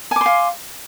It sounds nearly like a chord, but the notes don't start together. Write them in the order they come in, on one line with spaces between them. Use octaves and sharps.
G#5 D6 C6 F5